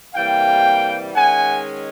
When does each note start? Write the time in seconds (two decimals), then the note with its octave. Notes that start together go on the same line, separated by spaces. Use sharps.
0.14 C3 E3 G3 A#3 F5 G5
1.14 D#3 G#3 C#4 F#5 G#5